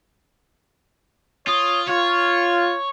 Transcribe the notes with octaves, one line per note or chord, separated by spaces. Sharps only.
F4 C#5 D#6
F4 C#5